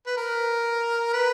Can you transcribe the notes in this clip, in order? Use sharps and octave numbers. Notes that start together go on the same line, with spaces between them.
B4
A#4
B4